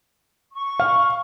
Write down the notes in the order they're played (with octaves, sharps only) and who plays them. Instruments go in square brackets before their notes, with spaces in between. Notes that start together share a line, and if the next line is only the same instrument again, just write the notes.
[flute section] C#6
[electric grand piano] F5